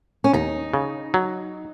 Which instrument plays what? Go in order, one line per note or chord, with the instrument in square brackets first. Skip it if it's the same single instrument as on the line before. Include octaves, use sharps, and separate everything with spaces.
[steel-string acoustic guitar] C#4
[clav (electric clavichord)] D#2 [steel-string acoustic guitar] D#4
[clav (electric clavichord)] C#3
F#3